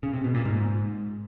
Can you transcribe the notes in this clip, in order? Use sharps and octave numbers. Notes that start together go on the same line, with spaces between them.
C#3
C3
B2
A#2
G#2